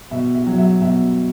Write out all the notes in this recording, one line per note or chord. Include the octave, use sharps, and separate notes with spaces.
B2 E5
E5
F#3
E5
B2 E5